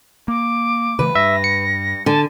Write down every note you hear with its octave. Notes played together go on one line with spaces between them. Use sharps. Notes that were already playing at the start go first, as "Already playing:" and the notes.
A#3 D6
C#3 E3 A3 B4
G2 E5 A#6
C#7
D3 G#5 A5